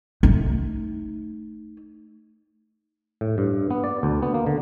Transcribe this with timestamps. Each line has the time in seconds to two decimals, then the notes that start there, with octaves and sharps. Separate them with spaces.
0.23 A3 D#4
3.21 A2
3.38 G2
3.71 B3
3.84 D5
4.03 D2
4.22 B3
4.34 A#3
4.47 D3